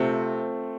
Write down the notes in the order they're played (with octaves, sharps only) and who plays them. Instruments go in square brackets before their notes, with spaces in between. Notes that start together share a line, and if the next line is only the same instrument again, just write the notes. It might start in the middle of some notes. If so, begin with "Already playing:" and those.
Already playing: [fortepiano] C3 [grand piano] A3 C4 F4